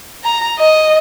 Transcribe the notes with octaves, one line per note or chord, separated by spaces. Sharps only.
A#5
D#5